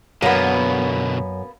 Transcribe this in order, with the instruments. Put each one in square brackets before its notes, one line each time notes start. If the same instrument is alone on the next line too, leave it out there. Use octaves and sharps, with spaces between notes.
[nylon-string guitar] F#2 [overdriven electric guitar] B2 D3 [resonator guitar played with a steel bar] A#3 B3